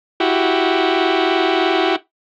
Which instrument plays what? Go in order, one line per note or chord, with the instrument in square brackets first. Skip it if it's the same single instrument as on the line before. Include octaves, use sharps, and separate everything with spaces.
[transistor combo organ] E4 F#4 G4